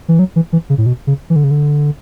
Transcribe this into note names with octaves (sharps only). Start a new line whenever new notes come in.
E3
F#3
E3
E3
C#3
A2
B2
C#3
E3
D3
C#3
D3